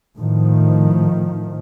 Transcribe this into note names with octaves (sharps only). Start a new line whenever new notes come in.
A2 D#3 F3